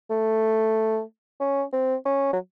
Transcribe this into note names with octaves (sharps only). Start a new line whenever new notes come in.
A3
C#4
C4
C#4
F#3